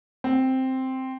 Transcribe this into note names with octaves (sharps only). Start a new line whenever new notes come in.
C4